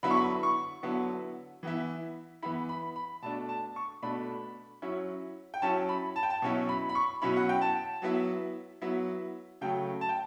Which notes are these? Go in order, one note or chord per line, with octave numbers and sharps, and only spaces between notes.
D3 F#3 B3 E4 B5
C#6
B5
C#6
D3 F#3 B3 E4
E3 B3 E4
E3 B3 E4 B5
B5
B5
B2 A3 D4 A5
A5
C#6
B2 A3 D4 B5
F#3 C#4 E4
G5
F#3 C#4 E4 A5
B5
A5
G5
A5
B2 F#3 C#4 E4
B5
B5
C#6
B2 F#3 C#4 E4 B5
F#5
G5
A5
F#3 B3 E4
F#3 B3 E4
C#3 F#3 A3 G5
A5
G5